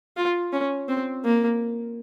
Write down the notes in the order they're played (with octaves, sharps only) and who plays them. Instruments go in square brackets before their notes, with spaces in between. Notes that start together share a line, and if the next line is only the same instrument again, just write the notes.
[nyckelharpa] F4
C#4
C4
A#3